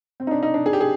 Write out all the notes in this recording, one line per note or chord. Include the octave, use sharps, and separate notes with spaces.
C4
D#4
D4
D#4
D4
G#4
G4
G#4